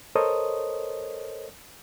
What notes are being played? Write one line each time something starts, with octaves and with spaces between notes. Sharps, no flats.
A4 A#4 C5 C#5 D#5 D#6